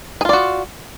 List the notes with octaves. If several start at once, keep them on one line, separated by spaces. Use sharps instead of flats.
F4 F#4 G#4 D5